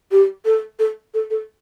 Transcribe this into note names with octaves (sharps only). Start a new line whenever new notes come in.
G4
A4
A4
A4
A4